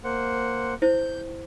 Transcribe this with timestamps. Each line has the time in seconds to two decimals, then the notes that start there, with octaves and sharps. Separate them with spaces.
0.04 A#3 C5 F#5
0.82 E4 C5 G6